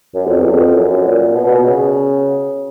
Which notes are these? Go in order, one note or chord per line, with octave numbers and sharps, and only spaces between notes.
F#2
F2
E2
F2
F#2
A#2
B2
B2
C#3